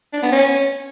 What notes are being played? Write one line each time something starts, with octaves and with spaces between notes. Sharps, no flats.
D4
B3
C#4